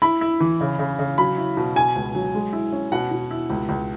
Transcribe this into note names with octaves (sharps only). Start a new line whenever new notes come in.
E4 B5
E4
E3
C#3
C#3
C#3
F#3 B5
E4
B2
B2 G#5
C#2
F#3
G#3
E4
C#4
B2 F#5
B2
E4
C#2
C#2